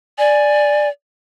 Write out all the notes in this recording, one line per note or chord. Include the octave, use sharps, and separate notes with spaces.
D5 G#5